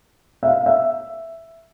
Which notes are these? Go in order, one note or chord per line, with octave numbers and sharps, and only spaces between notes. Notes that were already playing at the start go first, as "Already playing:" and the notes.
E5
F5
E5